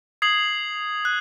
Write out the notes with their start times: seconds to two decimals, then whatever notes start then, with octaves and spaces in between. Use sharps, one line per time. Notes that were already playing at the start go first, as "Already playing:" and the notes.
0.22 D#6 G#6 C7 F#7
1.05 F#6